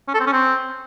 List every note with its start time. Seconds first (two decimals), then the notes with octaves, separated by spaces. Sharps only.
0.08 C#4
0.14 A4
0.20 C4
0.26 C#4
0.32 C4